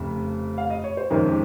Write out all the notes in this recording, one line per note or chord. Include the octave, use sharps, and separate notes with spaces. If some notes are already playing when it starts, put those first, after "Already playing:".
Already playing: F1 F2 C#3
F5
D#5
C#5
C5
F2 C3 D#3 G#3 C#4 A#4
G4